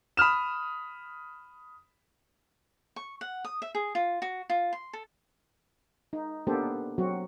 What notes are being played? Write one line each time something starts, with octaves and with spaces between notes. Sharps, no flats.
B5 D#6 F6 E7
C#6
F#5
D#6
E5
G#4
F4
F#4
F4
C6
A4
D#4
A#3 B3 D4 G4 A4 C5
F#3 C4 F#4